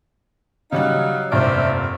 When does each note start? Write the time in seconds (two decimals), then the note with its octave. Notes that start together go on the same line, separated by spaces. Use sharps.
0.72 C#3 F#3 G3 D#4 F5 F#6
1.32 F1 G2 A#2 C5 D5 E5